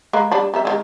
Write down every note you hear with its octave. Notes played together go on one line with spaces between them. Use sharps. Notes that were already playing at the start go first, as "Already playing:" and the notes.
G#3 A#3 B5
G3 D4 B5
G3 A#4 E5
D#3 F#3 G#3